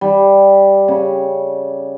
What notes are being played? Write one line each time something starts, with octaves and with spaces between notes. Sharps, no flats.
G3
C#3